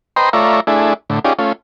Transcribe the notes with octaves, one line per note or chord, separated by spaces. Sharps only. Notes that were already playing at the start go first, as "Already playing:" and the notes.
B4 C5 D#5 G5 A#5 C6
A3 F4 C#5 D5 E5 A#5
A3 D4 E4 G#4
A2 D3
C#4 D#4 F4 G4 G#4 D5
A3 C#4 F4